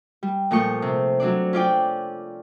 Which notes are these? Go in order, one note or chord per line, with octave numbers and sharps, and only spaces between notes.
G3
A#2 F3 A3 C#6 D#6 G6
C3
F#3 C4 D4 D5
C#4 F4 D5 G5